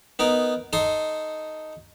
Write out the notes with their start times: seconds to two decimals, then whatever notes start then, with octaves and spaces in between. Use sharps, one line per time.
0.19 B3 D#4 A#4
0.73 D#4 A4 C6 D#6